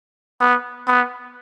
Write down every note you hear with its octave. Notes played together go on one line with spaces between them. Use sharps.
B3
B3